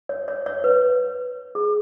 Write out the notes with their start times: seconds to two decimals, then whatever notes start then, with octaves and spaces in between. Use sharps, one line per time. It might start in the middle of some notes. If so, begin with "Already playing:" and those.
0.09 C#5
0.28 C#5
0.46 C#5
0.64 B4
1.55 G#4